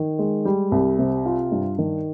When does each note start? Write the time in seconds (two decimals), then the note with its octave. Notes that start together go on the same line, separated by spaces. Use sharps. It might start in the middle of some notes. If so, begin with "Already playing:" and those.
Already playing: D#3
0.19 G#3
0.45 G3
0.72 C2
0.98 C3
1.26 F4
1.52 G2
1.78 D#3